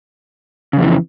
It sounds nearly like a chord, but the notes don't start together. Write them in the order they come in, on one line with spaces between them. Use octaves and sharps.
C#3 F2 E3